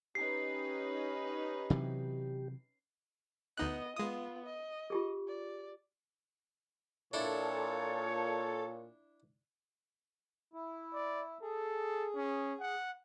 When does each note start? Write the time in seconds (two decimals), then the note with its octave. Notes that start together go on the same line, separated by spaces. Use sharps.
0.15 C#4 D#4 G4 B4 C7
1.70 C3 E3 F#3
3.57 D2 B3 D#4 D#5 F#6
3.96 G#3 B3 F4 D#6
4.46 D#5
4.90 F4 G4 G#4
5.28 D5
7.13 A#2 D4 E4 A4 C#5
10.53 E4
10.93 D5
11.42 G#4 A4
12.15 C#4
12.60 F#5